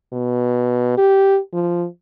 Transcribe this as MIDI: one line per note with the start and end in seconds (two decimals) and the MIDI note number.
0.13 0.96 47
0.98 1.39 67
1.53 1.86 53